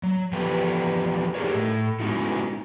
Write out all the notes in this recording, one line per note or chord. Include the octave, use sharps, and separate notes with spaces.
F#3
E3 F3 B3 G4 B4 G5
D#4 E4 G4 G#4 A#4 C#5
A2
G#3 B3 C#4 D#4 E4 F#4